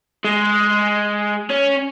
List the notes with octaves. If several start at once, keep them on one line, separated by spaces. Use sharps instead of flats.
G#3
C#4